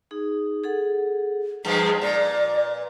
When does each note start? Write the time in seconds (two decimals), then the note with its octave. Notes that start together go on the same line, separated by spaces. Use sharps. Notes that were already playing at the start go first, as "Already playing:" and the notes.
0.11 D#4 G#4
0.64 G#4 A4 F#5
1.65 G2 F3 G#3 G#4 B4
2.01 A#2 D5